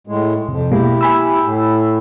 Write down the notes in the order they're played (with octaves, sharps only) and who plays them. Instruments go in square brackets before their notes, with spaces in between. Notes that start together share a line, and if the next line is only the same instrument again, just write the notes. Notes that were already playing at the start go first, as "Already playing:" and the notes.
[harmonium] A2 G#3
[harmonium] F2 [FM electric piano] C3
[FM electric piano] B2 G#3 A#3 [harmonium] E4 G4
[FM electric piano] G#5 B5 E6
[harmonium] A2